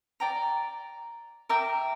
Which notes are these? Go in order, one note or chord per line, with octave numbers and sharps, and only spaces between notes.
D5 G5 A#5
A#4 E5 G5 D6